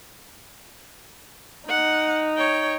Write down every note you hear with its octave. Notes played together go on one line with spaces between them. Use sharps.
D#4 F#5
C#5 G5